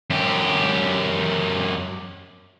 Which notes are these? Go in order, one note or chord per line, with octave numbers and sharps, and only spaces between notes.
F#2 G4